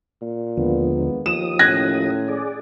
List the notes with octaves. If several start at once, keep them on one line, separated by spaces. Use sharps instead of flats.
A#2
D#2 D3 F3 G#3 A#3 B3
D#2 F3 D#6 E7
A2 C#4 F#6 G#6 A#6
G#4 D5